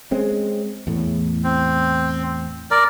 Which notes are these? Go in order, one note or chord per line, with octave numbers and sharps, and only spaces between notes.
G#3 C4 C#4
E2 A2
C4
A#4 D5